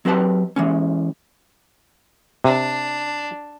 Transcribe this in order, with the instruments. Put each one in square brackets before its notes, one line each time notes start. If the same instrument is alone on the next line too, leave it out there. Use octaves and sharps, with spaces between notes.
[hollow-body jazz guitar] F#3 C4 G4 B4 A5
E3 G#3 C#4
[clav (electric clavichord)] C3 [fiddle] D4